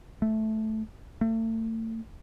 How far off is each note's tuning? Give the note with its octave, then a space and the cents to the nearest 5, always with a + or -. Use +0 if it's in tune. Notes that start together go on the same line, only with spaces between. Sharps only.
A3 -10
A3 +35